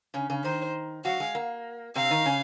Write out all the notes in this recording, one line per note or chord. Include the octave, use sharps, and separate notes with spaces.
C#3 C#4
C#3 C#4
D#3 D#4 C5
F#3 F#4 F5
G#3
A#3
C3 C4 F5
D#3 D#4
C#3 C#4